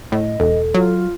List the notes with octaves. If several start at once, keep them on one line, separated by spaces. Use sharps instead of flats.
A2 D#5
E1 A4
F#3 F4